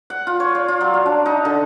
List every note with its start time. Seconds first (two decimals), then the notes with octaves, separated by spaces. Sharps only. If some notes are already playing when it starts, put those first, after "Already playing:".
0.10 F#5
0.27 F4
0.40 C#5
0.55 D5
0.68 F4
0.81 F#3
0.94 F5
1.06 D4
1.26 D#4
1.45 D3